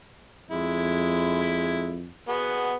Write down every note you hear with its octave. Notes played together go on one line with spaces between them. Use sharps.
F2 G#3 E4
B3 F#4 G#4